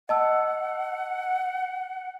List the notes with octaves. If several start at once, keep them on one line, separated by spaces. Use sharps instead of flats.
D#5 F#5 A5 E6